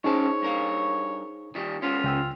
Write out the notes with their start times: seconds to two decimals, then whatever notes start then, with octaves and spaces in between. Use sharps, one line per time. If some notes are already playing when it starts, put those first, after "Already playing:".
0.04 G2 C#4 D#4 G#4 C5 C#5 A5
0.42 G2 A#4 F5
1.55 D#3 G3
1.82 G#3 B3 C#4 F4
2.04 C#2 G5 E6